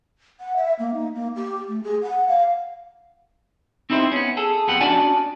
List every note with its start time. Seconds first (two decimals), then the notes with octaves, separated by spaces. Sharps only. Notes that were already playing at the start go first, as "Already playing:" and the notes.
0.40 F#5
0.56 E5
0.79 A#3
0.94 D#4
1.15 A#3
1.36 G4
1.68 A3
1.83 G#4
2.02 F#5
2.28 F5
3.90 C4 D#4 E4 G4 C5
4.12 B3 C#4
4.37 G#4 A4
4.68 F2 B3 G4 F#5
4.81 C#4 D4 F#4 D5 G#5 A5